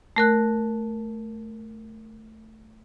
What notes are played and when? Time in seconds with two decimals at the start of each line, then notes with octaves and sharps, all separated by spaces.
0.16 A3 A#4 F#6